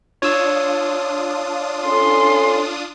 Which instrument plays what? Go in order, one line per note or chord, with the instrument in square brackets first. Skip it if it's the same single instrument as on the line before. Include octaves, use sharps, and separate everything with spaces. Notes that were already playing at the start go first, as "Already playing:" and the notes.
[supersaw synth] D4 F4 D#6 [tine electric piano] C#5 E6
[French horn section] C#4 A4 [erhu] C6